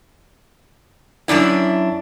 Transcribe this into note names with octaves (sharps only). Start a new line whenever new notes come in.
F#2 C3 D4 E4